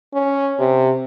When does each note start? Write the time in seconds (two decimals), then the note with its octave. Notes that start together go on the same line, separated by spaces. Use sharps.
0.14 C#4
0.59 C3